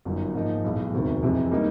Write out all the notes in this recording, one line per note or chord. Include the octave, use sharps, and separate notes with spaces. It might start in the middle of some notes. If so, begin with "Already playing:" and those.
G1 F#2 D#3
G#2 F3 A#3 D#4
B1 A2 E3 G#3
E1 D2 C3 D#3
F2 C3 E3 G#3
D#3 G3 A#3 D#4